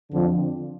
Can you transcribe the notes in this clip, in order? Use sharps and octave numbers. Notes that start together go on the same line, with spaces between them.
F2 D3 F3 C4